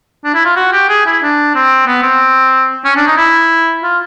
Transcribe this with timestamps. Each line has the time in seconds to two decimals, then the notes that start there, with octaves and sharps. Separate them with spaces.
0.24 D4
0.34 E4
0.45 F4
0.56 F#4
0.73 G4
0.89 G#4
1.06 E4
1.22 D4
1.55 C4
1.86 B3
2.03 C4
2.85 C#4
2.96 D4
3.07 D#4
3.17 E4
3.83 F4